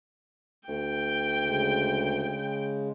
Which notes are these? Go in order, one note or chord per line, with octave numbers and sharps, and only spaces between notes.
D2 G5
C#3 G#3